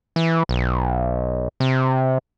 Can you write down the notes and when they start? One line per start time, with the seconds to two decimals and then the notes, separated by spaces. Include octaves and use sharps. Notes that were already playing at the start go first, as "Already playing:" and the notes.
0.16 E3
0.49 B1
1.60 C3